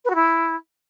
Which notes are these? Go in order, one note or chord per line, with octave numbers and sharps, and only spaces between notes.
B4
F#4
E4